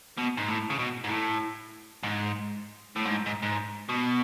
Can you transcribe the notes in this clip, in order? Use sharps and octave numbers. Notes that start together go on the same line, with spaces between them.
B2
G#2
A2
C#3
B2
G#2
A2
G#2
A2
G#2
G#2
G#2
B2